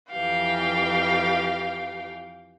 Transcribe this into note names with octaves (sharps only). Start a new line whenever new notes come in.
F2 E3 G4 F5 G5